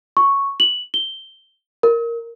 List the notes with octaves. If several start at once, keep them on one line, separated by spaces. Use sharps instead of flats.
C#6
F#7
G7
A#4